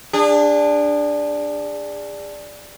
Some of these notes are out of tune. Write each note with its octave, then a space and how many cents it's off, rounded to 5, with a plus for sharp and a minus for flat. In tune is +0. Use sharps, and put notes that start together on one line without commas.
D4 +0 G#4 -35